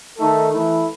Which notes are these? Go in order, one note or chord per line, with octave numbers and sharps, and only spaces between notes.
D#3 A3 D#4 A4
E3 A3 E4